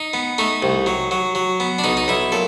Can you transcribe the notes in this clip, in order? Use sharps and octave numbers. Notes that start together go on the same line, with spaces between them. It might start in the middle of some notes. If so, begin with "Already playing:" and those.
Already playing: D#4
B3
A3 D#4
C2
F#3
F#3
F#3
B3
D4
B1 D#4
D#4
B1 E4
A#2 A4